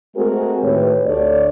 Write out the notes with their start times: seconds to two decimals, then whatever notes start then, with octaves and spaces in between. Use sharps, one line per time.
0.16 G#3 A3 C4 F#4 G#4 A#4
0.62 A2 D#3 G4 G#4 B4 C#5
1.06 D2 A3 D4 C#5 D5